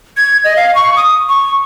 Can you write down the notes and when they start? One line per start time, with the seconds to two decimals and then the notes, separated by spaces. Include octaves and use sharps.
0.17 G#6
0.44 D#5
0.56 F5
0.75 C#6
0.96 D#6
1.29 C#6